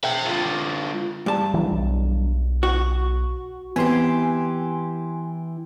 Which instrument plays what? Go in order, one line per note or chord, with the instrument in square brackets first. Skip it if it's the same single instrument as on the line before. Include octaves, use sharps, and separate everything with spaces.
[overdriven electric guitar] E5 G5
D3 F4
[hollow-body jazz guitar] G2 A5
[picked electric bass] E3 F#3
B1
[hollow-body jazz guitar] F#4
[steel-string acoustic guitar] E3 G4 [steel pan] B3 C4 B4 [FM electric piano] G#5 C6